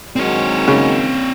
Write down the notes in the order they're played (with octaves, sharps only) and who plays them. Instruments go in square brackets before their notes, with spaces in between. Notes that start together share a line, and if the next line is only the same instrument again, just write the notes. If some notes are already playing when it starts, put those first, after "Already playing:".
[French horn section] D#3 F#3 G#3 [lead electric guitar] C4 C#5
[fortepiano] C#3